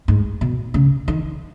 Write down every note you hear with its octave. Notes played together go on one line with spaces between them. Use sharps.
G#2
B2
C#3
D#3